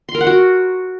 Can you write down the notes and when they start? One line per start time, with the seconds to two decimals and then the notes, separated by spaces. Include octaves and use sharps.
0.09 C6
0.15 A#4
0.21 F#5
0.27 F#4